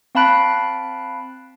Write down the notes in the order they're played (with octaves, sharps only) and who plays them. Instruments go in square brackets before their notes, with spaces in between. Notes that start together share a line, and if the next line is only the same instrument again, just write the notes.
[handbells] C4 F5 A5 B5 F#6 D7